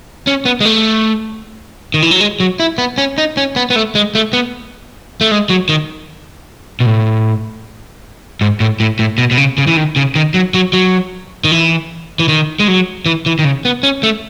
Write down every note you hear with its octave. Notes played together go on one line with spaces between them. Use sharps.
C#4
B3
G#3
A3
D#3
E3
F#3
G#3
F#3
E4
B3
C#4
D#4
C#4
B3
B3
A3
G#3
A3
B3
A3
G#3
F#3
D#3
B2
A2
G#2
A2
A2
A2
B2
B2
C#3
C#3
E3
D#3
C#3
D#3
F#3
F#3
F#3
D#3
E3
E3
D#3
G#3
F#3
E3
E3
D#3
C#3
B3
C#4
A3